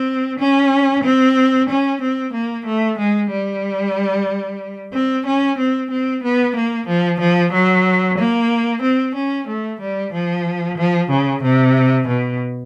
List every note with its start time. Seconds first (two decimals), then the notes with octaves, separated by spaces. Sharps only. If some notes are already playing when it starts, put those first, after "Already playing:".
Already playing: C4
0.39 C#4
1.04 C4
1.69 C#4
2.01 C4
2.33 A#3
2.66 A3
2.98 G#3
3.31 G3
4.93 C4
5.26 C#4
5.58 C4
5.91 C4
6.23 B3
6.56 A#3
6.87 F3
7.20 F3
7.53 F#3
8.18 A#3
8.82 C4
9.15 C#4
9.48 A3
9.80 G3
10.13 F3
10.77 F3
11.10 C#3
11.43 C3
12.07 B2